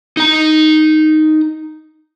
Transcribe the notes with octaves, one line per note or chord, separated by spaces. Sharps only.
D#4 A#5